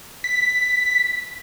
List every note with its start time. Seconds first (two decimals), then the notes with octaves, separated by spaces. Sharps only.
0.24 B6